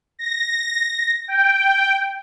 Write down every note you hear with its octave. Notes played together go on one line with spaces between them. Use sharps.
A#6
G5